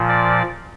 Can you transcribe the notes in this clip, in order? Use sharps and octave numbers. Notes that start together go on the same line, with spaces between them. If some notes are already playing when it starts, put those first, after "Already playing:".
Already playing: A#2 F3
D5